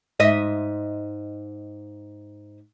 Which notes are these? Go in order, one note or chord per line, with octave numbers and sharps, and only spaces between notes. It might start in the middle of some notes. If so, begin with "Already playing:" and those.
G#2 D#5 E5